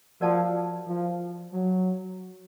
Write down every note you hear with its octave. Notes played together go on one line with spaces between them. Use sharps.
F3 F#4 A#4 D5 F#5 A5
F3
F#3